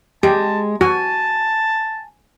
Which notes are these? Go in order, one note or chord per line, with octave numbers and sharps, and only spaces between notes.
G#3 G4 A5
F#4 G#5 A5